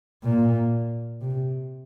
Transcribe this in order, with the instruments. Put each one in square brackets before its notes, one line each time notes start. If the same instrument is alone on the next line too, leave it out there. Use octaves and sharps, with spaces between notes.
[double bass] A#2
C3